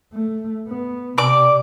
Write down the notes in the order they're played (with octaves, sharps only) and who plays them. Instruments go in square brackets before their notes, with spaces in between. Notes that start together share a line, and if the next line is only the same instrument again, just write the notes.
[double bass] A3
B3
[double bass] C3 [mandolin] D5 D6